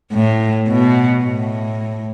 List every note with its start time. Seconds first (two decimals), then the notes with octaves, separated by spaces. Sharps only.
0.13 A2
0.69 B2
1.24 A2